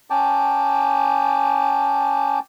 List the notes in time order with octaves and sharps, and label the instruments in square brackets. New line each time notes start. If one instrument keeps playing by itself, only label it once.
[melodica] C#4 G5 A5 D6